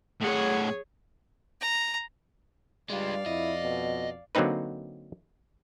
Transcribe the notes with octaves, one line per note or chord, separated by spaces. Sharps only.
A2 G#4 C#5 F#5
A#5
G2 G3 G#3 F4 D5 F5
F2 E4 D#5
B2
D3 F#3 A#3 C4 D#4 B4